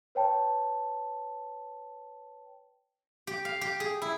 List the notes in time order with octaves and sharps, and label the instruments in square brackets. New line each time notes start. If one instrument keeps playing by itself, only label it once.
[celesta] B4 C#5 G5 A5
[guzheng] G4
F5
G4
G#4
E4